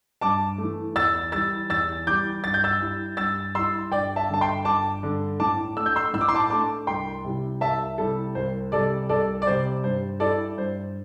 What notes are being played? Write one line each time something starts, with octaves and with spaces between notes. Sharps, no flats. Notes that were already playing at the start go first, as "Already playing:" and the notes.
G2 A5 D6
A3
E3
E2 E6 A6
E3 G3 E6 A6
E2 E6 A6
E3 G3 D6 G6
G2 A6
G6
E6 A6
G3 E4
G2 E6 A6
G3 E4 C6 E6
G1 D5 G5
E5 A5
G2 D3 A5
G5 C6
G1 A5 D6
G2 D3
A2 A5 D6
A3 D4 E6
G6
C6 E6
A2 E6
D6
C6
A5 D6
A3 D4 A5 D6
C2 G5 C6
C3 G3 E4
C2 E5 A5
C3 G3 E4 A4
C2 C5
C3 G3 A4 D5
C2 A4 D5
D5
C3 G3 C5
G2 C5
G3 E4 A4 D5
G2 C5